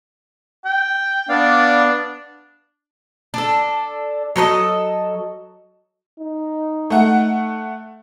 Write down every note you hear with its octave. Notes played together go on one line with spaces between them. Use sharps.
G5
B3 D4 D5 F5
D4 A4
F#3 A4 B4 D#5
D#4
A3 F#5